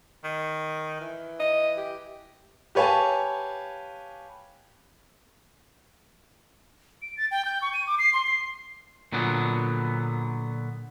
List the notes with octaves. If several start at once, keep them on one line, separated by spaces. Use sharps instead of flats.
D#3
E3
D#5
G4
G4 B4 C#5 F5 G#5 A5
D7
A6
G5
G6
C#6
D#7
D6
C7
C6
C7
A#2 D3 F#3 B3